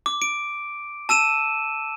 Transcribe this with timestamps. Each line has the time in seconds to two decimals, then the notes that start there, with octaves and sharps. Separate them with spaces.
0.06 D6
0.22 D7
1.09 A5 E6 D#7 E7